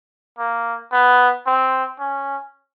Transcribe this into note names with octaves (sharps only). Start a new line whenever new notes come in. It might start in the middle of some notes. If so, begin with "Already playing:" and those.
A#3
B3
C4
C#4